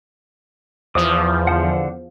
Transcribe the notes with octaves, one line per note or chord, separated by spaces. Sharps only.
E2 F3 D6 D#6
D3 C5 F#5